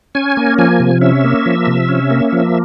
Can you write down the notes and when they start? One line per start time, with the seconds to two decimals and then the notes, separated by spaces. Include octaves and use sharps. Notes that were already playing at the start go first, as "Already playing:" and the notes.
0.15 C#4 G#5
0.37 A#3
0.58 F3 G#5
0.80 C3
1.01 C#4 E5
1.24 A#3
1.46 F3
1.67 C3
1.89 C#4
2.11 A#3
2.32 F3